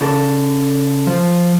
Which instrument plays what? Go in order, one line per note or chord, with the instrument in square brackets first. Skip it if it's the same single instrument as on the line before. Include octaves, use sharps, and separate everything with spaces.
[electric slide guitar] C#3 A4
[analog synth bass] F3